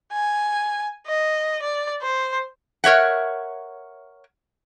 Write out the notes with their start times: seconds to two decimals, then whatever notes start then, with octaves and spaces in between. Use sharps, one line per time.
0.13 G#5
1.07 D#5
1.62 D5
2.02 C5
2.84 A#4 C#5 E5 F#5